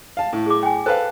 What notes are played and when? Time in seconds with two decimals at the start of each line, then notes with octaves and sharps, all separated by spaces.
0.17 F5 A5
0.33 A2
0.46 G#4 D6
0.63 G5 G#5
0.86 A4 B4 C5 F5